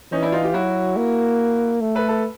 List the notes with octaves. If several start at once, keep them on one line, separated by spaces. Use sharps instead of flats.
E3 C#4 D#4
D4 E4
D#4 F4
F4 G4
F#3 E4 F#4
A#3
A3
A4 B4
A4 B4